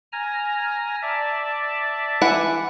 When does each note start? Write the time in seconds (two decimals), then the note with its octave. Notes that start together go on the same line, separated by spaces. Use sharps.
0.13 G#5 A#5 F6
1.02 D5 E5 A5
2.22 E3 E4 F#5